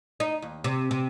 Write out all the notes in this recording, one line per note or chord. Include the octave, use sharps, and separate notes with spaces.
D#4
D#2
C3
C3